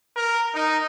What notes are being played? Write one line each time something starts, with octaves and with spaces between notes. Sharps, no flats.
A#4
D#4